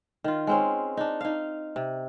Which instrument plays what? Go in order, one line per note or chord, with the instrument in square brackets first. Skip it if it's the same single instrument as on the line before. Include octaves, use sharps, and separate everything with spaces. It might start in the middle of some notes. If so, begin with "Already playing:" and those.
[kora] D#3 F4
G#3 C4 C#4
D4 D#4
D#4 F5
C3